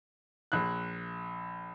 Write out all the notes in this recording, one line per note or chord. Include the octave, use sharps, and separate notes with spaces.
A#1 F#6